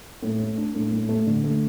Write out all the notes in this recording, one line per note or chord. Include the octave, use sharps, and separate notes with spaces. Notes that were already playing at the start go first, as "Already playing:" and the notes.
A2
A3
D4
A2
A2
A3
D3
A3